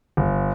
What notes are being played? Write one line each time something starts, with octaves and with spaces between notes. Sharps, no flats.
G1